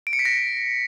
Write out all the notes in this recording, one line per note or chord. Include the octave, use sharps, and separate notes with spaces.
D7
C#7
B6
A#6